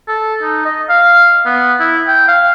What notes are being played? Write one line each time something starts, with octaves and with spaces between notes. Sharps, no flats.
A4
D#4
D#5
F5
B3
E4
G5
F5